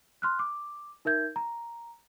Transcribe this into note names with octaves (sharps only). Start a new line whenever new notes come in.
C6 F6 F#6
D6
D#4 A#4 E5 G6 G#6
A#5